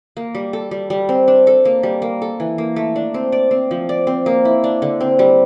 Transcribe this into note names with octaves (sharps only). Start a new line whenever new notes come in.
A#3
G3
A4
G3
G3
C4
D4
A4
A#3
G3
A#3
A4
E3
A#3
A3
D4
C4
D5
C4
F3
D5
C4
A#3
E4
D4
D3
C4
G3